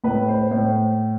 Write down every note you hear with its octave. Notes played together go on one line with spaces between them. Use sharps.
A2 B4
C5
A2 C5